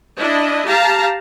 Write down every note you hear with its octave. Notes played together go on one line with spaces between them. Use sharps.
D4 E4 D#5
G4 F5 A5 A#5